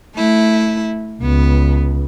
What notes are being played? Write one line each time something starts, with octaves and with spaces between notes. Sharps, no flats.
A3 E4
C#2 B3